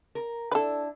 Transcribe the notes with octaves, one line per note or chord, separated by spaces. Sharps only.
A#4
D4 E4 A4 B4